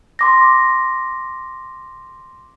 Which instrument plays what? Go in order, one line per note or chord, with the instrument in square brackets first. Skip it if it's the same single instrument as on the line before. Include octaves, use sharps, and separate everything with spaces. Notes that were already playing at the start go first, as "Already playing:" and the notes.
[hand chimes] C6 D6 A#6